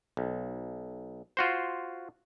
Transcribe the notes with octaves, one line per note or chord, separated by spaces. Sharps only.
B1
F4 F#4 C5